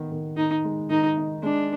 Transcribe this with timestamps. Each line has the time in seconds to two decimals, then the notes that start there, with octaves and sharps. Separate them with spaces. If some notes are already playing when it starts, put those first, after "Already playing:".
Already playing: D#3 B3
0.12 D#3
0.37 D#3 D#4
0.64 G#3
0.90 D#3 D#4
1.17 D#4
1.43 G#3 D4